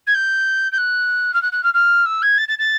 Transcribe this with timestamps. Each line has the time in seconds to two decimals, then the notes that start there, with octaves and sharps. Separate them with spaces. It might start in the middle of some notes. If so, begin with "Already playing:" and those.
0.07 G#6
0.14 G6
0.72 G6
0.77 F#6
1.34 F6
1.42 F#6
1.52 F#6
1.63 F6
1.74 F6
2.05 E6
2.22 G#6
2.38 A6
2.48 A6
2.58 A6